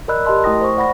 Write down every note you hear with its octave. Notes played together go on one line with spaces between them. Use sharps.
A#4 D5 D#5 B5 E6 F#6
G4 A#4 D#5 A5 C6
A3 E4 G5 D#6 A#6
C5 C#6
D5 F#5 B5 A#6